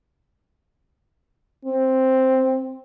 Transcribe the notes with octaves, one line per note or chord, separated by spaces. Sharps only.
C4